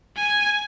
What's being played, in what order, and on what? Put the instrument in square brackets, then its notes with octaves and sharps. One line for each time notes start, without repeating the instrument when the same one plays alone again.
[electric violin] G#5